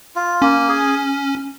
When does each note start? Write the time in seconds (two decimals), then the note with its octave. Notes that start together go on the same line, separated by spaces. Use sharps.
0.16 F4
0.42 A#3 C#4
0.68 G#4